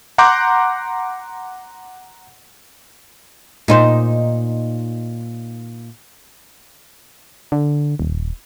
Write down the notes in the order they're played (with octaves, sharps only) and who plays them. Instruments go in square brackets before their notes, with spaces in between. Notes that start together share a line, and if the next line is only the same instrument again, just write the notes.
[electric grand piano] F#5 A#5 C6 D6 F#6 G6
[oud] A#2 D#4 C5
[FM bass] D3
D#1